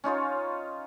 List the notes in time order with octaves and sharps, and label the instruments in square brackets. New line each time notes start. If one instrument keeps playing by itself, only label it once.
[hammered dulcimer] C#4 D#4 F4 C#5